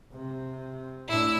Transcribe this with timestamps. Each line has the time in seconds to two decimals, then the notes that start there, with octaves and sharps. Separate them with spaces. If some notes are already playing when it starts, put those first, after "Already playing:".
0.13 C3
1.08 A2 D4 E4 E6